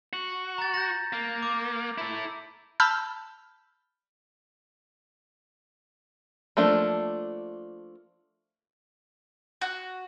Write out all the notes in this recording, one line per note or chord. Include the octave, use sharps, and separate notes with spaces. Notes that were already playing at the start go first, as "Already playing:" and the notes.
F#4
A#5 A6
G6 A#6
A#3
D6
E4 A4
A5 B5 E6 F6 G6
F3 A3 A#3 D4
F#4